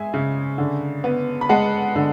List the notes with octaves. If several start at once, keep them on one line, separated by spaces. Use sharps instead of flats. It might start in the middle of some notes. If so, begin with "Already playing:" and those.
Already playing: G#3 E5 G#5
C#3
D3
B3
B5
G#3 F#5 A5
D3